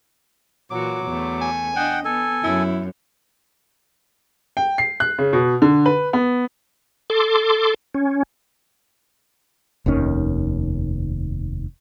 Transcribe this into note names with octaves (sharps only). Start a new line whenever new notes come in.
A#2 E3 F#3 F#4 D6
E2 A3
G#5
D4 D#5 F#5 G5
B3 A4 G#5
F#2 E4
G5
C7
F#6
C#3
B2
D3
B4
B3
A4 C6 D6
C#4
F1 D#2 D#3 C#4